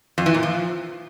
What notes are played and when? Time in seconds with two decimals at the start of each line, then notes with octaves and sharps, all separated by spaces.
0.18 F2
0.26 E3
0.34 A#2
0.43 F3